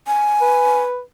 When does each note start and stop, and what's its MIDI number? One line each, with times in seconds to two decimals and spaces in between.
0.07 0.78 80
0.41 1.00 71